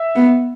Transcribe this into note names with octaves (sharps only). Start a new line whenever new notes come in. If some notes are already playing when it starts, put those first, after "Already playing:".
Already playing: E5
B3